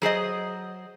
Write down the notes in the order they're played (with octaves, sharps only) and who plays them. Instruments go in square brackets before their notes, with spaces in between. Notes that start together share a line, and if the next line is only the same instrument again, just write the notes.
[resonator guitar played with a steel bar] F#3 G#4 C5 D#5